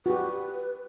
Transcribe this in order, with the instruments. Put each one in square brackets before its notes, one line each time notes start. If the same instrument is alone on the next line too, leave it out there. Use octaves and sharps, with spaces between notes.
[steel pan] F#4 G4 [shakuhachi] B4